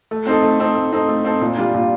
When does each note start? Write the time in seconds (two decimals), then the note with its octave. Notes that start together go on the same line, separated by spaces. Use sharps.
0.11 A3
0.27 C4 D#4 A4
0.43 A3
0.60 C4 D#4 A4
0.76 A3
0.93 C4 D#4 A4
1.09 A3
1.24 C4 D#4 A4
1.41 A#2
1.58 G3 D4 F4
1.74 A#2